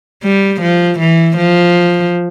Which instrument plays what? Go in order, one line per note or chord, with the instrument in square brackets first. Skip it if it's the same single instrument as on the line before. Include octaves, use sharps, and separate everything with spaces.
[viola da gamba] G3
F3
E3
F3